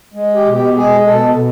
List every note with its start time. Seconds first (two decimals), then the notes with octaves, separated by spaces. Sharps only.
0.14 G#3
0.35 G4
0.46 B2
0.55 G4
0.75 G#3 G#4
1.06 B2 A4
1.36 B2